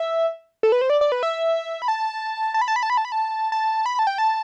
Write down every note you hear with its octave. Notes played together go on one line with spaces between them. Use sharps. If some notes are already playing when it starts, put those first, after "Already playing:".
Already playing: E5
A4
B4
C5
D5
D5
B4
E5
B5
A5
A5
B5
A5
B5
A5
B5
A5
B5
A5
A5
B5
A5
G5
A5